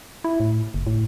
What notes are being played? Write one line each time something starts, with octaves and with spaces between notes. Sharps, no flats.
E4
A2
F#1
A2